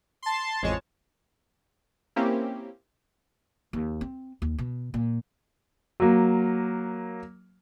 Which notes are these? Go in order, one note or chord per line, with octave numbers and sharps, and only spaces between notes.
A5 C6
A1 F2 G#3 C#5 A5
A#3 C4 C#4 E4 G4
D#2
C4
D#2
B2
A#2
F#3 A#3